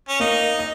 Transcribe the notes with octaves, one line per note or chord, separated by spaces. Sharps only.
C#4
A#3 D#4
D#5